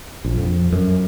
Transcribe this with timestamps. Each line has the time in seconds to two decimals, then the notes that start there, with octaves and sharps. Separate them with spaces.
0.25 A#1
0.37 F2
0.72 F#2